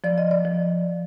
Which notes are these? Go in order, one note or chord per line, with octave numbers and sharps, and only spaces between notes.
F3 D5
D#5
D5
F3